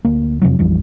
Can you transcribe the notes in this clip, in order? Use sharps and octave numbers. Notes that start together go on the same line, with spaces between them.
D2 A#3
F2 C3 F3 F#3
A#1 F2 E3 G3